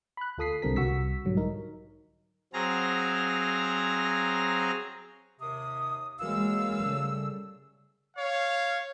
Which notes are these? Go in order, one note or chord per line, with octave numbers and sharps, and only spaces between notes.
B5 F#6
D2 F4 A4 D#6 B6 C7
C2 D3 G3 C4 A#4 B6
C2 F#4 C#6 E6 B6
B1 G#2 D3 F#3 G3
D#4 A#4
F#3 C4 G#4 F5 A#5 A#6
D#2 C3 D#6
F#2 E3 G#3 A#3 F5 E6
C#3 G3 A3
C#5 F5